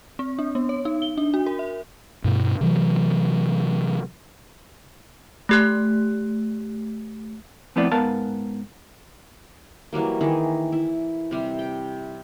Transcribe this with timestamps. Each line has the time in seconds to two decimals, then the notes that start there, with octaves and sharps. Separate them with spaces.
0.19 C4
0.39 D4
0.55 B3
0.69 C#5
0.85 D#4
1.02 G7
1.17 D4
1.34 F#4
1.46 A#4
1.59 E5
2.24 G2 B2
2.61 C3 E3 F#3
5.49 A3 G4 F#6
7.76 F3 A3 B3 C4 E4 D5
7.92 G#2 B3 A#4 B4 F5 A5
9.93 E3 F#3 G3 A#3
10.21 D#3 E3 G#4
10.72 E4
11.31 C3 G3
11.59 G5